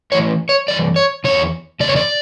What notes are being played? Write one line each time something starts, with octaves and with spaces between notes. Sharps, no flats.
A2 E3 C#5
C#5
G2 E3 D5
C#5
E2 B2 C#5
E2 C#3 D5
C#5
D5